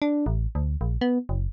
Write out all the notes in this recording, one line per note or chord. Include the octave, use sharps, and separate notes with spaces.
D4
A1
D2
A#1
B3
F#1